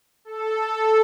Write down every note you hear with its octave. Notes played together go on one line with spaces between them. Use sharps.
A4